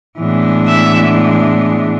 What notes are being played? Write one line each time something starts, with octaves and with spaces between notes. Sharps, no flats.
A2 E3 G#3 B3 D4
E5